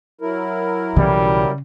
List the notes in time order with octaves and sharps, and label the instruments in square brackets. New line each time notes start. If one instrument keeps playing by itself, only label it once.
[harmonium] F#3 E4 A#4
[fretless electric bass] B1 E3 [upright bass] C#3 [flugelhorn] G3